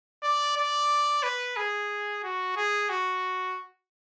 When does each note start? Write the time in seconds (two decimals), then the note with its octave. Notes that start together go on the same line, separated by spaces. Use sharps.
0.23 D5
0.57 D5
1.23 B4
1.57 G#4
2.23 F#4
2.56 G#4
2.89 F#4